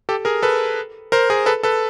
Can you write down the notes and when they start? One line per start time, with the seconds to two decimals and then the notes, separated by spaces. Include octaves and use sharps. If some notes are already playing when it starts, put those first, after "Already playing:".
0.09 G4 A4
0.25 G#4 A#4
0.42 A4 B4
1.12 A#4 C5
1.30 G#4 A#4
1.46 A4 B4
1.63 A4 B4